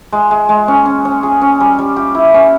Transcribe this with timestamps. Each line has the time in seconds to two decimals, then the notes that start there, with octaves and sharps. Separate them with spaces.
0.12 G#3
0.31 G#3
0.49 G#3
0.68 C#4
0.86 C#4
1.05 C#4
1.23 G#4
1.41 C#4
1.60 G3
1.79 G3
1.96 G4
2.15 E4
2.34 C#4